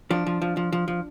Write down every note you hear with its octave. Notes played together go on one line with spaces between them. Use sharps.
F3 D4
F3
F3
F3
F3
F3